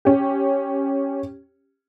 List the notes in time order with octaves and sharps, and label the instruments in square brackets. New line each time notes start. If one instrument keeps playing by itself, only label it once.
[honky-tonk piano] C#4 G4